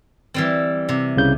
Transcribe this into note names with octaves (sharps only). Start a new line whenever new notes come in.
E3 G3 C4
C3
C2 C#3 G6